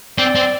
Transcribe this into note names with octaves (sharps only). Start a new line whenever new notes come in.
C4 D5
C4